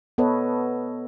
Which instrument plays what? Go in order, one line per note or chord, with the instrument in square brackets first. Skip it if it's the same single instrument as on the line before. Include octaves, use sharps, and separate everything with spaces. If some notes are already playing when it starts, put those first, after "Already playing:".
[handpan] B3 A4 B4 C#5 D#5